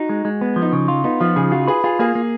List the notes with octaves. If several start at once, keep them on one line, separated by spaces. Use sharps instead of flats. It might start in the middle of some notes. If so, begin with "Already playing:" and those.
Already playing: D#4 F#4
G#3
G#3
B3
F3
D#4
C#3
F4
B3 D#4
F3 F4
C#3 G#4
F4 F#4
G#4 B4
F4 G#4
A#3 G#4
A#3